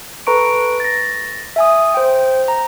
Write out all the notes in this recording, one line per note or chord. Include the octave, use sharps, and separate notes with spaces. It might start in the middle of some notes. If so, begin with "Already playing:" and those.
A4 B4 A#5 C#6 D7
A6 A#6
E5 G#5 D#6
C5 G5
A#5